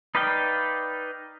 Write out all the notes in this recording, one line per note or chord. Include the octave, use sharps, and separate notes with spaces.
D#4 B4 D5 F5 G5